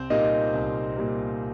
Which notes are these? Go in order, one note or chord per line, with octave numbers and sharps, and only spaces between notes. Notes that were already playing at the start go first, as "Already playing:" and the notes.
Already playing: C2 C4 C5
A#2 G3 A#3 D#4 D#5
C2
A#2 G3 A#3